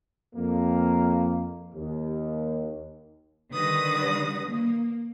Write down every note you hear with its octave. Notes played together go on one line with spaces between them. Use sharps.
F2 A#3
D#2
D3 D#3 G3 B4 D#6 A#6
A#3